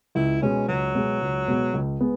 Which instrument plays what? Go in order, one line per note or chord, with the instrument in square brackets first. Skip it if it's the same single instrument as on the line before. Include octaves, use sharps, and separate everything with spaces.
[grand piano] C#2 [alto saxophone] E4
[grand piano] B2 G#3 B3 [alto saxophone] C#4
[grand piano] C#2 [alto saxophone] F#3
[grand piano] B2 G#3 B3
C#2
B2 G#3 B3
C#2
G#3 B3